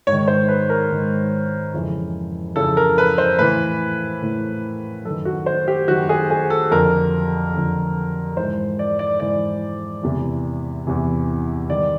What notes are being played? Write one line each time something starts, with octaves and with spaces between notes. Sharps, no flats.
G#2 C#5
D#3
C5
B4
A#4
G#2 D#3
F2 C#3 E3
F2 C#3 E3 A4
A#4
B4
C5
A2 E3 B4
A2 E3
F#2 D#3 A4
F#4
C5
G4
F#2 D#3 F#4
G#4
G#4
A4
F2 D3 A#4
F2 D3
G#2 E3 C5
D5
D5
G#2 E3 D5
E2 C3 E3
E2 C3 E3
G2 D#3 D5